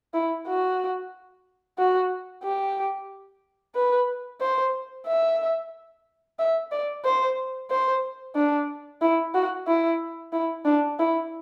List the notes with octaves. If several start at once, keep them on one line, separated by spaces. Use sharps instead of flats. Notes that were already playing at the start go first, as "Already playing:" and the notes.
E4
F#4
F#4
G4
B4
C5
E5
E5
D5
C5
C5
D4
E4
F#4
E4
E4
D4
E4